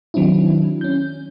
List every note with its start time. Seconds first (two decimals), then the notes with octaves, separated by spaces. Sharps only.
0.14 D#3 F#3 C4 D4 E4
0.81 C#4 G6